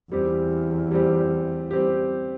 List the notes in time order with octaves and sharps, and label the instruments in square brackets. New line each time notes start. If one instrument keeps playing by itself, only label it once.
[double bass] E2 [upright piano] G3 C4 G4
[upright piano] G3 C4 G4
G3 C4 G4